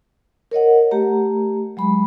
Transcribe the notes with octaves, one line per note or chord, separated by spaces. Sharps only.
A#4 C#5 D#5 F#5
A3 G4 A#5
F#3 G#3 B5